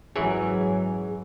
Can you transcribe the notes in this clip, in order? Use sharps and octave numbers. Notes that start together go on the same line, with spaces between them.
G#1 F#2 E3 F#3 G#4 C#5